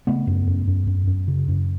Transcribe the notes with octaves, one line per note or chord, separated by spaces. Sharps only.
C#3 A3 B3
F#2
F#2
F#2
F#2
F#2
C#3
F#2